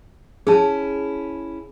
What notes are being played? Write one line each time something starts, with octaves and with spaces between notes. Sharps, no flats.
C#4 E4 G#4 A5